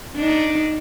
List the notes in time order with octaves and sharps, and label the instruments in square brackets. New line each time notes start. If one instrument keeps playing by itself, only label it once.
[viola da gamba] D4 D#4